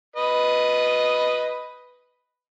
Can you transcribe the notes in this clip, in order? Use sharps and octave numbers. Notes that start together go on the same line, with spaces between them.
B4 D#5